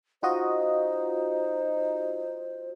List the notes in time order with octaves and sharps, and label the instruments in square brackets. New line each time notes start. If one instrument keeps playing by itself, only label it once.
[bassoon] D#4 [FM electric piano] F4 F#4 D#5 [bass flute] C5